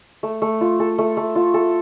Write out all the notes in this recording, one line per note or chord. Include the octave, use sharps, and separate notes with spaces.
A3
A3
F4
A4
A3
A3
F4
A4